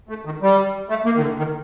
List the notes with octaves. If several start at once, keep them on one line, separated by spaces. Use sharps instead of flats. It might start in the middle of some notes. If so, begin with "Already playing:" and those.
A3
D#3
G3
A3
A#3
D#3
D3
D#3